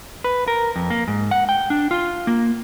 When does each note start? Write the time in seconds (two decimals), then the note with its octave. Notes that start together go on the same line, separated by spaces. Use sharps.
0.24 B4
0.48 A#4
0.76 F2
0.90 A#3
1.08 G#2
1.31 F#5
1.49 G5
1.70 D4
1.91 F4
2.27 A#3